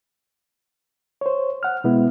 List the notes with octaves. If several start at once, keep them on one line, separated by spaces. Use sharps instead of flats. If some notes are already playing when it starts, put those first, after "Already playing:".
C5 C#5
F#5 F6
B2 G#3 B3 E4